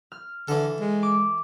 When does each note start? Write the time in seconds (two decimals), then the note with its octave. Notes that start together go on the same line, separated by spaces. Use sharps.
0.12 F6
0.48 D3 E3 A4
0.80 G#3
1.03 D6